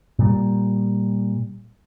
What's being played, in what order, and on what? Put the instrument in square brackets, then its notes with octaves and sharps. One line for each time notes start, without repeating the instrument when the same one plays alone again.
[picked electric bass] A#2 G3